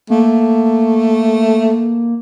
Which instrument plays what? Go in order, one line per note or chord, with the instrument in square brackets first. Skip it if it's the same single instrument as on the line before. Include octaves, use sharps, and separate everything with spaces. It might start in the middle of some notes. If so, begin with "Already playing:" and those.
[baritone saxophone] A3 [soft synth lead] A#3